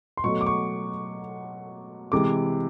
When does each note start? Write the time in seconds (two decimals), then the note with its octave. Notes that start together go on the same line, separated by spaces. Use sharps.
0.17 C6
0.24 B2 F#3 A3 C#6
0.41 D6
0.46 C#6
2.12 C3 E3 G#3 D6